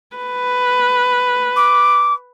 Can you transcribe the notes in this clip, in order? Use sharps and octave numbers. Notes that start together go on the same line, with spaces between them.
B4
D6